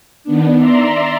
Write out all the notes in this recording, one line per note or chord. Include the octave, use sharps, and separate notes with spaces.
D#3 B3 D4
D5 E5 A#5 C6